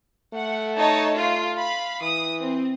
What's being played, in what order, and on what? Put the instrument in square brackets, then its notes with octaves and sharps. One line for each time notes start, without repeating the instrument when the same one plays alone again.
[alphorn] A3 [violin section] F#5
[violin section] D#4 C#5 A5
F4
F5 B5
[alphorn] E3 [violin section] D#6
[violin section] C4